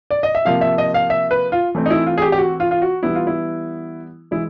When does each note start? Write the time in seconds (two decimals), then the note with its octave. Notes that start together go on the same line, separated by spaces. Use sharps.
0.11 D5
0.23 D#5
0.35 E5
0.45 C3 F3 A#3 F5
0.61 E5
0.78 D#5
0.94 F5
1.10 E5
1.31 B4
1.52 F4
1.75 E3 A3 C4
1.86 D#4
1.90 E4
2.06 F4
2.18 G#4
2.22 G4
2.32 G4
2.38 F#4
2.60 F4
2.71 F4
2.82 F#4
3.03 E3 G3 B3 E4
3.15 F4
3.27 E4
4.31 E3 G#3 E4